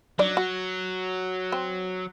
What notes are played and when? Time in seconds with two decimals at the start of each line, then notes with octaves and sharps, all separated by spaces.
0.19 F#3 D4 D#4 D5
0.37 F#4
1.52 C4